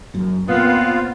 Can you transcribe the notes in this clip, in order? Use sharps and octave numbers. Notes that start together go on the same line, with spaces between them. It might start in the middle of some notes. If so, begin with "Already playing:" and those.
F#1 F#2
A#2 B3 C4 F4 F5